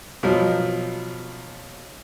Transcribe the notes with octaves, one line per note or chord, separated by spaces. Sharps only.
B2 F3 F#3